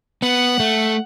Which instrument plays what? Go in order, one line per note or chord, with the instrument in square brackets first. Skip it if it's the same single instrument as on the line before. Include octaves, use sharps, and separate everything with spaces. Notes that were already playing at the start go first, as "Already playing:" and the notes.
[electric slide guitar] B3 [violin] F#5
[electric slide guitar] A3